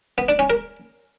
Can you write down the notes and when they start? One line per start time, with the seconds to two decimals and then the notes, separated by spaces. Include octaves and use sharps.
0.18 B3
0.29 D4
0.39 C#4
0.50 A#4